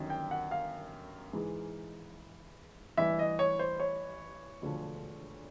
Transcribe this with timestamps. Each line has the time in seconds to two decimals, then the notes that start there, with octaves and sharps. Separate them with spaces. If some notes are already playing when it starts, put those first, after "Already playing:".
Already playing: G1 F#2 D#3
0.10 G5
0.31 F#5
0.51 F5
1.33 G#2 E3 G#3
2.97 A1 G2 E3 E5
3.19 D#5
3.39 C#5
3.59 C5
3.80 C#5
4.62 E1 D2 D3 F3